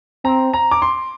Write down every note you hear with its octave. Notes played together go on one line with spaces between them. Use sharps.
C4 A#5
A#5
D6
C6